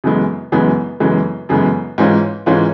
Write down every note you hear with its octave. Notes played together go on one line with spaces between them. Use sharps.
F#2 C#3 E3 G#3 B3
F#2 C#3 E3 G#3 B3
F#2 C#3 E3 G#3 B3
F#2 C#3 E3 G#3 B3
G#2 E3 G#3 C#4 F4
G#2 E3 G#3 C#4 F4